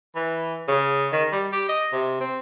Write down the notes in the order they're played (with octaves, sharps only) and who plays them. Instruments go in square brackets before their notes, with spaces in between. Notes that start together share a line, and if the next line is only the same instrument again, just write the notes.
[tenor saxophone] E3
C#3
D#3
G3
G4
D#5
C3
C4